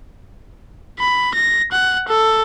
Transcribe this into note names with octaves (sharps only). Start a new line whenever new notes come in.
B5
A#6
F#5
A4